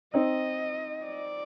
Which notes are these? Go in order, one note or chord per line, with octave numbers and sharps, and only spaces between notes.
C4 D#4 D#5
D5